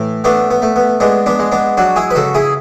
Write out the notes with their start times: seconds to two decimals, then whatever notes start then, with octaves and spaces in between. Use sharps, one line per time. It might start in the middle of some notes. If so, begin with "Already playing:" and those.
Already playing: A2 E3
0.24 A3 B3 D4
0.50 B3
0.62 A3
0.76 B3
1.00 G#3 B3 D4
1.26 B3 D4
1.39 G#3
1.52 B3 D4
1.77 F#3 D4 F#4
1.96 E4 G#4
2.10 B4
2.15 C#3 F#4 A4
2.35 E4 G#4